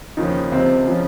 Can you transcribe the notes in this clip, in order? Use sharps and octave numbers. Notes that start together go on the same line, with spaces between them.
D#2 C#3 F3 D#4
C#2 C3 F3 C4
C#3 F3